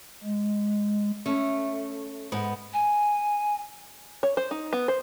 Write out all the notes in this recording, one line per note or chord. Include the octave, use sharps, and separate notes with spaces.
G#3
A3 C#4
G#2 B3
G#5
C#5
C5
D#4
B3
C5